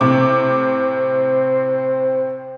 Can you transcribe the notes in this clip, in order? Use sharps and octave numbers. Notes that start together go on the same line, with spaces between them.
A2 C3 C4 D6